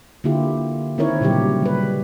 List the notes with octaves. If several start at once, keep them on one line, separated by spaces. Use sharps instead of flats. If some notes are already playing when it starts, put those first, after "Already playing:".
D3 A#3 E4 F4 G4
D#3 C4 D#4 E4 A#4 C#5
A#2 C#3 F#3 G3 G4
G3 B4